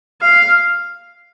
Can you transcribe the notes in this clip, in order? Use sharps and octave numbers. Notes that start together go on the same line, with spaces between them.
F5